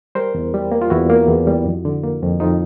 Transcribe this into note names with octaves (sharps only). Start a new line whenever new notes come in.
G3 A#4 C5
E2
G3
A#3
F4
E2 E4 F#4
A#3
E2
G3
F2
D3
A#3
F2
F2 D#4 F4